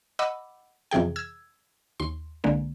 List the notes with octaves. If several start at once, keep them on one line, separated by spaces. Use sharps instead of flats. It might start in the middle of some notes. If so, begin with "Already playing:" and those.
D#5 F#5 B5 D6 E6
F2 C3 E3 G#4 G5
E6 G#6
D#2 C6
C2 D3 G#3 A#3